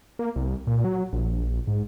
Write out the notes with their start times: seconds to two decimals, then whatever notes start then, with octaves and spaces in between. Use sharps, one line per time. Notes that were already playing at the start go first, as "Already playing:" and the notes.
0.19 A#3
0.36 C2
0.67 A#2
0.84 F#3
1.13 A#1
1.67 G#2